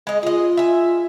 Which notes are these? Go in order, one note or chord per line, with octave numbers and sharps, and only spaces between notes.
G#3 D#5
F4 G#4 D#5
E5 G#5